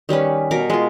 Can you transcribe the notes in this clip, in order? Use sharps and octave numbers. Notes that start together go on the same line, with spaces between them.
D#3 G3 C#4 B4
B2 A#4 D6
G#3 F4